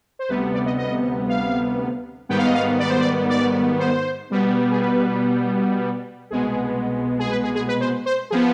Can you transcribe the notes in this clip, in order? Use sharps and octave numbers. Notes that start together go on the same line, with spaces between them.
C5
D2 C3 G3 B3 B4
D5
D#5
D#5
F5
G#2 D#3 G3 B3 G5
F5
D#5
F5
D5
C5
D5
D5
C5
B2 G3 B3
G#4
B4
C2 B2 G#3 B3 G#4
G#4
B4
G#4
G#4
B4
C5
C5
F3 B3 G#4